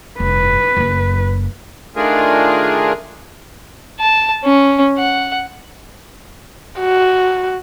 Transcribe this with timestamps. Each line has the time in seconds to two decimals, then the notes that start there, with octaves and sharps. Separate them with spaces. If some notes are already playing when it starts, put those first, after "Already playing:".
0.20 F1 G2 B4
0.77 F#1 F#2
1.96 D#3 A3 D4 F4 G#4 A#4
3.99 A5
4.44 C#4
4.98 F#5
6.80 F#4